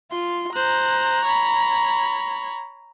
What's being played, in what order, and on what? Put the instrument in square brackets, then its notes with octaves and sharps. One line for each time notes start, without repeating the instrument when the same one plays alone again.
[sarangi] F4 [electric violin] C6
[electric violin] C5 F#6 [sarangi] A#5
[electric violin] C#5 B5